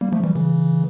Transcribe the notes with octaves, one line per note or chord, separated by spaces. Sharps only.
G3 A#3
F3 A3
E3 G3
C#3 E3